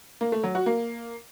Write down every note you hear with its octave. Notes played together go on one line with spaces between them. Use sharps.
A#3
A3
F#3
F#4
A#3